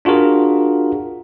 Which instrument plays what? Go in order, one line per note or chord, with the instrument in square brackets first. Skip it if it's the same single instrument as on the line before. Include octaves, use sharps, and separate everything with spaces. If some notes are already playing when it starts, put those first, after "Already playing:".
[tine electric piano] D4 F4 F#4 G#4 A#4